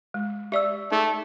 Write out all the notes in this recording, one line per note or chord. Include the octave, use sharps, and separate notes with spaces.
G#3
G4 D5 E5 E6
A3 D#4 G#4